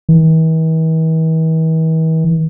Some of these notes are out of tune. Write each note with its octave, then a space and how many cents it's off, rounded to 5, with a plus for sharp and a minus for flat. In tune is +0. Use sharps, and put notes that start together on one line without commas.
E3 -45